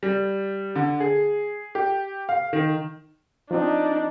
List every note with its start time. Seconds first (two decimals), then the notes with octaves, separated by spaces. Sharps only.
0.03 G3
0.75 D3
1.00 G#4
1.75 G4
2.29 F5
2.53 D#3
3.51 F3 C4 D4 D#4